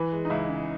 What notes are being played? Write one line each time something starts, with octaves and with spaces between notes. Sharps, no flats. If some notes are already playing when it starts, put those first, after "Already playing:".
Already playing: E3 B4
G#3
D#4
C#2 E4
C#3